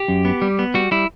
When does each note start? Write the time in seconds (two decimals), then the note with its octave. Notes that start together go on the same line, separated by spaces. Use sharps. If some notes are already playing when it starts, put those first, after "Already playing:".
Already playing: G4
0.08 F#2
0.25 B3
0.42 G3
0.59 B3
0.74 G3 F#4
0.91 G3 E4